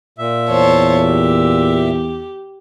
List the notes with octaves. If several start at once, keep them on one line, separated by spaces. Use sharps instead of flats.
A#2 E5
E2 C5 C#5 A5
G4